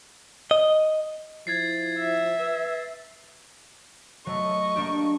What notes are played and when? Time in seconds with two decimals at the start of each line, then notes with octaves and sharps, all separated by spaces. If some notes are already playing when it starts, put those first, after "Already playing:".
0.51 D#5
1.47 F3 E4 G#6 A6 C7
2.00 E5
2.40 B4
4.26 F#3 A3 D#5 C#6
4.76 A#3 D4 G4